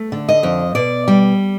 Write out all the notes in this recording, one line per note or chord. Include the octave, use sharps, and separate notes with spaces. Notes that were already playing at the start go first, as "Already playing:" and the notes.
Already playing: A3
D3
D#5
F2
B2 D5
G3